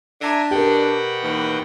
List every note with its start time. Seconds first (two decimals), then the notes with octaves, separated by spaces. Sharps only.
0.22 D4 E5 G#5 A#5
0.51 B2 G4 A#4 F#5 G5
1.22 D#2 E3